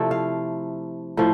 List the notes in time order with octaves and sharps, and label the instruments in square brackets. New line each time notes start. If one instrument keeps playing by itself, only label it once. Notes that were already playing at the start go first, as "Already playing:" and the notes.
Already playing: [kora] C3 F3 A3 E4 D5
F5
A2 F3